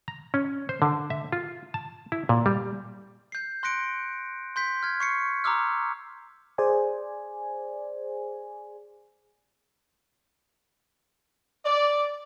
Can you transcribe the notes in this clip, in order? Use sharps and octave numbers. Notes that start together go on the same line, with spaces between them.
A#5
C#4
C5
D3
E5
F4
A5
E4
A#2
G3
G6 C7
C6 F#6 A#6 C#7 D7
C6 G6 B6
F6 G#6
C#6 C7 C#7
A#5 C6 D6 E6 F6
G#4 C5 D5 G#5
D5